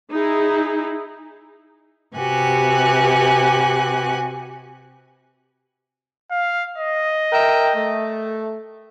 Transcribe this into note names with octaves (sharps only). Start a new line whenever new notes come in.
D#4 E4 G#4
C3 F#4 G4 B4 G#5 F#6
F5
D#5
A#4 E5 G5
A3